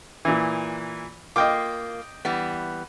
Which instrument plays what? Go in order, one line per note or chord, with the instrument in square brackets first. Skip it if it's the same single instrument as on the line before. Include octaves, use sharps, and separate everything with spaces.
[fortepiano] A#2 E3
[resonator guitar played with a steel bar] A#3 F4 [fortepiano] D#5 G5 D6
[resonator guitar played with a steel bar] E3 G3 B3